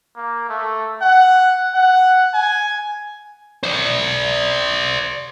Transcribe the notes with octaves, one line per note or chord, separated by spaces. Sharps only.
A#3
A3
F#5
F#5
G#5
C5 D5